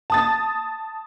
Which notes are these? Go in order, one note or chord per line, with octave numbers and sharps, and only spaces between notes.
A5 D#6 A6